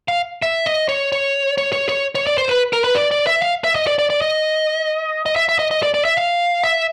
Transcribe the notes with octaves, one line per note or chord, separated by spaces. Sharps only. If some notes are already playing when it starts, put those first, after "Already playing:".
F5
E5
D#5
C#5
C#5
C#5
C#5
C#5
C#5
D5
C5
B4
A#4
B4
D5
D5
E5
F5
E5
D#5
D5
D5
D5
D#5
D#5
E5
E5
D#5
D#5
D5
D5
E5
F5
E5